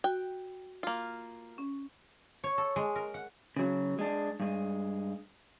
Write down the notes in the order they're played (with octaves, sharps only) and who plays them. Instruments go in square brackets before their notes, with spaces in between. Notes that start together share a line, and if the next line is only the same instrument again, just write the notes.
[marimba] F#4 [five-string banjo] G5
[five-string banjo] A#3 F4
[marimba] C#4
[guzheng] C#5
A4
G#3
A#4
F#5
[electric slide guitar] C#3 F#3
G#3 D4
G2 G#3